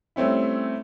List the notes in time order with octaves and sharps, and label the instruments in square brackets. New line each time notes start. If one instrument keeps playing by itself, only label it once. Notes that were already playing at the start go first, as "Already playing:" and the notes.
[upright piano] G3 A3 C4 C#4 E4